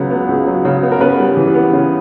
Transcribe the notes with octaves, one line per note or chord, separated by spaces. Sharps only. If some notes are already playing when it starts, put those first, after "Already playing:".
Already playing: C#2 C#3 F#3 B3
B3
C#2
F#3
C#3
B3
A#4
C#3 B3 B4
G3
E3
B3
C#3